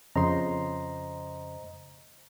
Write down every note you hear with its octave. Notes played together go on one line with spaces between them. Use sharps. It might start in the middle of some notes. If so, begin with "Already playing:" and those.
F2 C#3 C5 D#5 A#5 C6